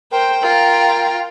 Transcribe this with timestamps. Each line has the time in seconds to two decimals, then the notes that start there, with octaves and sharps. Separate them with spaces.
0.12 A#4 C5 G5
0.42 F4 A#4 A#5